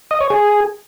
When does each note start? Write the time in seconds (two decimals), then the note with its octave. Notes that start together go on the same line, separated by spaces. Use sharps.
0.11 D#5
0.21 C#5
0.30 G#4